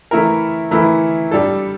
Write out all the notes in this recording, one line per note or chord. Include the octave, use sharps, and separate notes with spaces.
E3 A3 E4 A#4
E3 A3 E4 A#4
G3 D4 A4